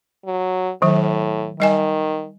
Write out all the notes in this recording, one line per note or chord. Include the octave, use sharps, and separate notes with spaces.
F#3
A2 D#3 F#3
D#3 G3 D#5 G#5